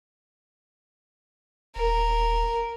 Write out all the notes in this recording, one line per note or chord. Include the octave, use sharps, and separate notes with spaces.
D#1 A#4